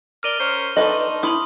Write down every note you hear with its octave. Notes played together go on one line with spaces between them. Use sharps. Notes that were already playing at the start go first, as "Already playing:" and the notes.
A#4 D5 F6 D#7 G7
C#4 A#4 C5
D4 D#4 A4 B4 D#5 C6 C#6
E4 B5 C6 D#6